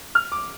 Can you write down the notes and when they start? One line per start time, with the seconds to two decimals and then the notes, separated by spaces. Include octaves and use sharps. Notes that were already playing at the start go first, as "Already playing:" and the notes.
0.15 F6
0.32 D6